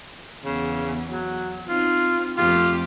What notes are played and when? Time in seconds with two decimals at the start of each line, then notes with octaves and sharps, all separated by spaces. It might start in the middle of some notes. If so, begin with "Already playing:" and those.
0.45 E2 C#3
1.10 F#3
1.68 C4 D#4 F4
2.37 F2 A3 F4 G4